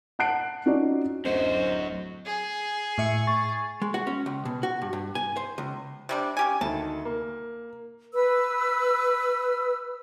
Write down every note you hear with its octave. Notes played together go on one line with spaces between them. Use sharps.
F#5 A5 F#6 C7 D7
C#4 D#4 F4 F#4 D5
D1 F#2 F#4 C5 D#5
G#4
A2 E5 C#7
C#6 A6
G#3
F#4
C#4
C#2
B2
F#4
G2
G2
G#5
C5
C#2
C3 G3 D4
C#4 G4 G#5
D2 D#3 A5
A#3
B4 E6